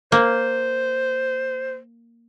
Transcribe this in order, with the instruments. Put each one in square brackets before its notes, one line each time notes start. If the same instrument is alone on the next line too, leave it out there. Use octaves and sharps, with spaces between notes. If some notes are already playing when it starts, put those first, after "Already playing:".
[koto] A#3 [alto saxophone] C5